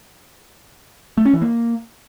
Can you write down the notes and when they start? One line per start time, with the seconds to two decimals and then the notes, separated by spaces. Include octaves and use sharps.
1.17 A3
1.25 C#4
1.34 E3
1.42 A#3